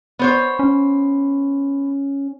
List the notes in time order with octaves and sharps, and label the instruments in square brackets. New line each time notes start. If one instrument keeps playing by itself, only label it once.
[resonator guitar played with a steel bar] B3 C5 C#5
[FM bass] C#4